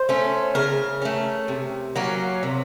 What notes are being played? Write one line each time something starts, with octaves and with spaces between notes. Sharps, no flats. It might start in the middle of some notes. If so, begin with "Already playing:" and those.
Already playing: C5
A3 C#4
C#3 A#4
A3 C#4
C3
F#3 A#3 C#4
C3